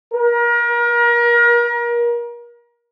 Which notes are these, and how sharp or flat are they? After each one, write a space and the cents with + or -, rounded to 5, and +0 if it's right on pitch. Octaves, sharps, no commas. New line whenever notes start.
A#4 +35